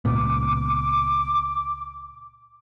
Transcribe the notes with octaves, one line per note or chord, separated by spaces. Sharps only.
C#2 A#2 B3 D6